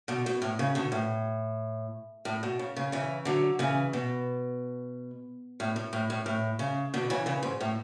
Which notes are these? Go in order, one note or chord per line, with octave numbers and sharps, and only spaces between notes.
B2 D3
B2
A2
C#3
B2 D3
A2
A2
B2
C#3
C#3
C#3 E3
D3 F#3
C#3 E3
B2
A2
A2
A2
A2
A2
C#3
B2 D3
C#3 E3
C#3 E3
G#2
A2